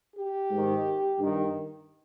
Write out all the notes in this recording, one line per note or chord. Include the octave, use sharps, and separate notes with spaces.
G4
G#2 D#3
G2 D#3